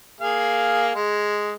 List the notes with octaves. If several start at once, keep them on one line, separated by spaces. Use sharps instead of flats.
A#3 G#4 F5
G#3